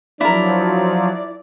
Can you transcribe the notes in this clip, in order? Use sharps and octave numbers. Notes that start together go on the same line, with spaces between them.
F3 F#3 D4 E4 A#4 D5